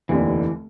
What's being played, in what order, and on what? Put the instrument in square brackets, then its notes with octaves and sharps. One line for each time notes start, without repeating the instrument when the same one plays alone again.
[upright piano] F1 D#2 D3 [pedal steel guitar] E3